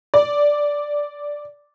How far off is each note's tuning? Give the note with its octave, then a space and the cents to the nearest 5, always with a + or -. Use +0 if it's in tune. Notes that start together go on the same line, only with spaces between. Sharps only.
D5 -5